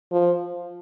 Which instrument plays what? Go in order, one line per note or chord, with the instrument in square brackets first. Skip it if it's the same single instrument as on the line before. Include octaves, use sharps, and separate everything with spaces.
[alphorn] F3